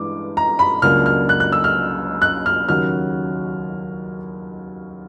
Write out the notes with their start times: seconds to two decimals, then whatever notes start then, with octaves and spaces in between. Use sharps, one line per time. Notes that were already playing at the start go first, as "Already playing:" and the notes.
Already playing: G2 E3 G#3 D6
0.37 A#5
0.59 B5
0.82 C#2 C#3 F#3 A#3 D4 F6
1.06 F6
1.29 F#6
1.40 F#6
1.52 E6
1.64 F6
2.22 F#6
2.46 F6
2.69 D#2 C#3 F#3 F6